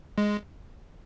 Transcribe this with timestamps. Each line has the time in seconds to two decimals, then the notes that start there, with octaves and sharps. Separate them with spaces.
0.18 G#3